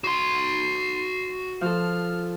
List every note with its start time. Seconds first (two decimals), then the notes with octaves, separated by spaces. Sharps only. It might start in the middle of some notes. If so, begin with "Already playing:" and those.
0.04 F#4 C6 C7
1.61 F3 A4 F6